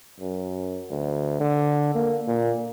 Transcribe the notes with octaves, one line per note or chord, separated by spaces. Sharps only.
F#2
D2
D3
A#3
A#2